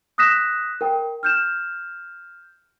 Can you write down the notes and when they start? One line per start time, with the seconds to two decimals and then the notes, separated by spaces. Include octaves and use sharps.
0.18 D#6 F#6 A#6 B6 E7
0.81 A#4 G5
1.23 F6 G6 E7